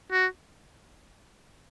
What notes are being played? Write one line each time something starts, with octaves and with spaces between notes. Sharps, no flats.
F#4